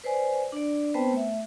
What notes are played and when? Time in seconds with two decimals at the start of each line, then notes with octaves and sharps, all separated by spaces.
0.04 B4 C5 D5 G#5
0.52 D4 D5
0.94 B3 C4 B4 C5 G5 A5
1.12 A3 E5